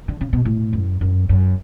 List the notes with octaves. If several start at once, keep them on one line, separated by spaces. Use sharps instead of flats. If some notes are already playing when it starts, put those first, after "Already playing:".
D3
C#3
B2
A2
F#2
F#2
F#2